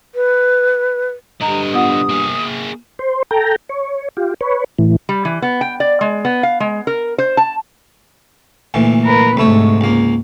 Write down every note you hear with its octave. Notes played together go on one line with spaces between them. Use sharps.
B4
G2 D3 D#5 A#5
B3 F4 F#5 D#6
A#3 G#4
C5
A4 G5 A#5
C#5
F4 G4
B4 C#5
A2 E3
G3
E3
B3
G5
D5
G#3
B3
F5
G#3
A#4
C5
A5
D2 A#2 E3
A#4 B4
D2 G#2 C3 A3 C#5
C#2 A#3